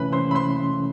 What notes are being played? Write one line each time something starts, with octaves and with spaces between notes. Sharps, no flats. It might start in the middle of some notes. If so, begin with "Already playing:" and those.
Already playing: C3 E3 A3 C#4 B4 B5
C5 C6
B5
C5 C6